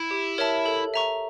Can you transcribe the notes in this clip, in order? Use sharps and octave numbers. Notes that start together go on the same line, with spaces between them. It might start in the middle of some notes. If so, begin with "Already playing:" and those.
Already playing: E4
G4
A#4 C#5 E5 A5
A4
E5 A#5 C#6